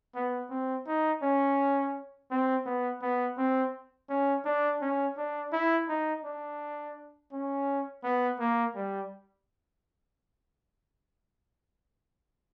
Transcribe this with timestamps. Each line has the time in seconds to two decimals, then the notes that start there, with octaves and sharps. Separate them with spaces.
0.15 B3
0.51 C4
0.87 D#4
1.23 C#4
2.31 C4
2.66 B3
3.02 B3
3.38 C4
4.09 C#4
4.45 D4
4.81 C#4
5.17 D4
5.53 E4
5.89 D#4
6.25 D4
7.32 C#4
8.04 B3
8.39 A#3
8.75 G3